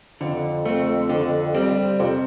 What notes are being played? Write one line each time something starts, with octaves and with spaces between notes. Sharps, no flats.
F2 D3
A3 C4
D3
G3 C4 G4
F2 C3